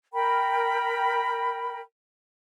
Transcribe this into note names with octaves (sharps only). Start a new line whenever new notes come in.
A#4 G5 B5